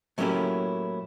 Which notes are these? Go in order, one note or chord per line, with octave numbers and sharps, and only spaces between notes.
A2 F#3 A#3 C#4 E4 G4